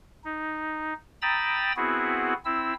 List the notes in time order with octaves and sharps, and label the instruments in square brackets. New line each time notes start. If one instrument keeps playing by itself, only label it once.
[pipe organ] D#4
G5 A#5 B5 D#6 E6 A6
B3 C4 E4 F#4 G#4
C4 E4 E6